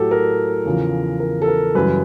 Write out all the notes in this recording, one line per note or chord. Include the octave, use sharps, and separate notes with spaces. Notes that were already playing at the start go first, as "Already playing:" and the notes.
Already playing: A2 F#3 F#4 G4 A4
A#4
E2 C#3 F3
A#4
A4
A#4
F#2 C#3 E3 G3 B4